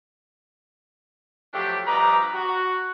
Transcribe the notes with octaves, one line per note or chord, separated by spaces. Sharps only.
F3 F#3 A3 D4 G4
G2 F3 G4 B4 D#5 A#5
F#4